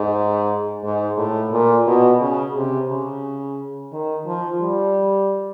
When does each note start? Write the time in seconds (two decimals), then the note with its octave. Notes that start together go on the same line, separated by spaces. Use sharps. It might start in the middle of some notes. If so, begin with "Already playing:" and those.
Already playing: G#2
0.83 G#2
1.18 A2
1.52 A#2
1.87 B2
2.21 C#3
2.55 C3
2.89 C#3
3.92 D#3
4.26 F3
4.62 G3